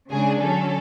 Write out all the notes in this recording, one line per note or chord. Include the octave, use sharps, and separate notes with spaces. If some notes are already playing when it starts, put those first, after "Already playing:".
C#3 G#3 D4 G#4
D3 F#3 C#4 A4